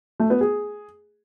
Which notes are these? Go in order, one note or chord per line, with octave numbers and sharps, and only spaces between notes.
A3
B3
G#4